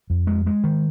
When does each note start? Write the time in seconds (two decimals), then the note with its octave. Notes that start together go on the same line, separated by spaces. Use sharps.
0.10 F2
0.27 G#3
0.46 G#3
0.64 D#3